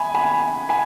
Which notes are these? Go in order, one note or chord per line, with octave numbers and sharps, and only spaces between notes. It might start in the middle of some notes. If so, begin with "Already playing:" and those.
Already playing: G#5 B5
G#5 B5
G#5 B5